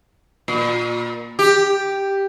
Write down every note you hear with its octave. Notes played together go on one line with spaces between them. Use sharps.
A#2
G4